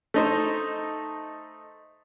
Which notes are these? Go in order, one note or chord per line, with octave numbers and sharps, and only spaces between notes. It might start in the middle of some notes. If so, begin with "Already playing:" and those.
A3 D#4 C5